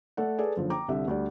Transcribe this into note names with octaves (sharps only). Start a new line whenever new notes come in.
A3 A4 D5 F#5
G#4 A4 B4 D5
F#1 D3 F3
G5 A#5 D6
C2 D3 E5
D2 G3 D5